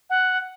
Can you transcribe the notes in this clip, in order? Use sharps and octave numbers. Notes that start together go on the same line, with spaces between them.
F#5